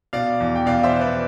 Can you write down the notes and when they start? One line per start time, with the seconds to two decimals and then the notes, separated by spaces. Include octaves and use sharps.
0.13 B2 D5 F5
0.40 E2
0.55 G5
0.66 B2 D5 F5
0.83 C5 E5
0.93 B2
1.01 B4 D5